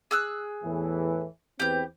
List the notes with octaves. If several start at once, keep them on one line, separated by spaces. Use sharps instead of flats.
G#4 E6 F#6
E2 A2 E3
E2 C4 G4 B4 G6